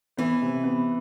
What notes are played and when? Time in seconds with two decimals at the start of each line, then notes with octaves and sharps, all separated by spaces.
0.17 E3 B3
0.41 C3
0.64 B3